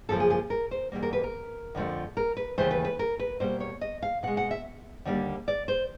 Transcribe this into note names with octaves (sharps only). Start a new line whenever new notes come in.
F#2 C#3 F3 A#3 A4
G#4
G#4
A#4
C5
E2 B2 G3 A#3
A#4
B4
A#4
F2 D3 F3 A3
A#4
B4
D#2 C#3 E3 A3 C5
B4
B4
A#4
B4
B2 G3 A#3 C5
C#5
D#5
F5
B2 G#3 F#5
F#5
E5
D#2 D3 G3 A#3
D5
C5